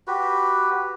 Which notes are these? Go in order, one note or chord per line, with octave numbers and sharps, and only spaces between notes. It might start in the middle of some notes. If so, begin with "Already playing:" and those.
F#4 G4 B4